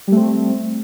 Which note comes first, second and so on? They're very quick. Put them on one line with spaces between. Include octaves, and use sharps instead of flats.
G3 A3 C4